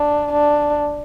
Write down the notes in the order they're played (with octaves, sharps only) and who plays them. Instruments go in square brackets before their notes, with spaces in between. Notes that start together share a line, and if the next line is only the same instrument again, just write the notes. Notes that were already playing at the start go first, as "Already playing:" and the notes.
Already playing: [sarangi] D4
D4